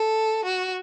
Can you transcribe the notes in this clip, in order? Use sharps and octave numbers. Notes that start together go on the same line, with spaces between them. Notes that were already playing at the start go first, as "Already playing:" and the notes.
Already playing: A4
F#4